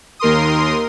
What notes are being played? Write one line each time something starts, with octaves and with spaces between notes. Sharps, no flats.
D#2 A#4 C6 D#6